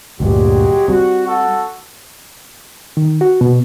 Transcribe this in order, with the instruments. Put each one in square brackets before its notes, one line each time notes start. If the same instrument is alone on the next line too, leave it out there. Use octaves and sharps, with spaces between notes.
[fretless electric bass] D2 G2 A#2 [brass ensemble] F#3 G#3 G4
[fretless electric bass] G3 C4 [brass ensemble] F#4
[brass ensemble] F#4 A4 F#5
[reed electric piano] D#3
F#4
B2